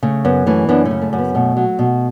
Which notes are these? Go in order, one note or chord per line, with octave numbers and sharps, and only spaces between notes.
C#3 A3
F#2 B3
E3 A3 C#4
F#2 B3 D4
A3 C#4
C#3
A3
F#2
B3
B2 A3
F#3
B2